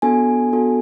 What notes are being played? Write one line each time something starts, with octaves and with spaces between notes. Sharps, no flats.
B3 D4 F#4 A4 G#5
B3 D4 F#4 A4